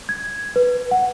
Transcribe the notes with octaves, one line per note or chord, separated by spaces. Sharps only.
G#6
B4
F#5